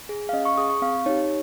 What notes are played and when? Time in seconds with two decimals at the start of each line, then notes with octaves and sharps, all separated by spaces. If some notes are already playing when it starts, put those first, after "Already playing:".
0.09 G#4
0.29 F5
0.33 C#4 D#5
0.45 C#6
0.58 G#4 D#6
0.70 C#6
0.82 C4 F5
1.06 D#4 G4 C#5